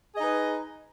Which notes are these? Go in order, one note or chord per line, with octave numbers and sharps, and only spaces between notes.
D#4 G#4 B4 D#5